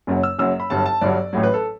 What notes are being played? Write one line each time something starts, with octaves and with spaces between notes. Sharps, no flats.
F#1 F#2 F#3
E6
F#1 F#2 F#3 E6
B5
G1 G2 F#3 A5
A5
G1 G2 F#3 D5
A1 A2 F#3
B4
A4